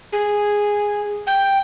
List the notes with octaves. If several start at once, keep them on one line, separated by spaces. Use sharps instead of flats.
G#4
G5